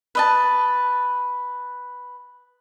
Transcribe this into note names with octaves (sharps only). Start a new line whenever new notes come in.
B4 D#5 A5